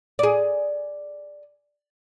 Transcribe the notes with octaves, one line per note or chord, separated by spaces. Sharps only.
G#4 D5